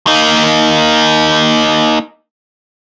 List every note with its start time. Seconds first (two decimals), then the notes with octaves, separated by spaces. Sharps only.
0.07 A#3 D#4